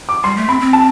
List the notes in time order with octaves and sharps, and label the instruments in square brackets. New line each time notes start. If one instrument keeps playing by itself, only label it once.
[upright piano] D6
[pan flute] G3 [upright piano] C6
[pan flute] A3
[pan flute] C4 [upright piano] B5
[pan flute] C4
[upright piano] A5